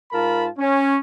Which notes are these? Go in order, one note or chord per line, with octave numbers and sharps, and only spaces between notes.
G#2 F4 A#4 A5 B5
C#4